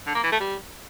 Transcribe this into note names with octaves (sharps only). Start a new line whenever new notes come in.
D3
A#3
E3
A3
G3